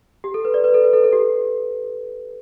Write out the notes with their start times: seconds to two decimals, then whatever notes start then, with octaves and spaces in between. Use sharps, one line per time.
0.24 G4
0.34 A4
0.45 B4
0.54 D5
0.64 B4
0.74 A4
0.84 B4
0.93 A4
1.04 A4
1.13 G4